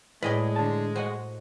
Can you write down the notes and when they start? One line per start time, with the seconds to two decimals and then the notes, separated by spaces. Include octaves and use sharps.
0.23 A2 G#3 G#4 B4 D5 D#5 G5
0.56 D3 A5
0.96 F#4 C5 D#5 F#5